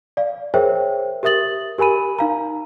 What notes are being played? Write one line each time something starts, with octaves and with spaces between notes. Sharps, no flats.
D5 F5
G#4 A#4 C5 C#5 E5 G5
G4 A#4 E5 D#6 A6 F#7
G4 A#4 G#5 B5 D#7
D#4 F5 A#5